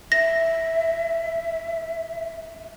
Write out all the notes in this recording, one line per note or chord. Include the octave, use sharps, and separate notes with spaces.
E5 A#6